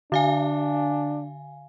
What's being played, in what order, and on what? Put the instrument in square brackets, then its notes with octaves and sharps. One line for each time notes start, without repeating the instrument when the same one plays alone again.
[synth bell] D3 F5 G#5 [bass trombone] D4